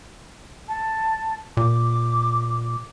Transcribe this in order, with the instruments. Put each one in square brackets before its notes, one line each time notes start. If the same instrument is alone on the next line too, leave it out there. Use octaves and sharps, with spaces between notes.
[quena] A5
[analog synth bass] A#2 [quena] D6